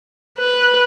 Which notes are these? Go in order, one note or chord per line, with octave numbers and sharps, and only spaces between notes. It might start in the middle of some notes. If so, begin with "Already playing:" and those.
B4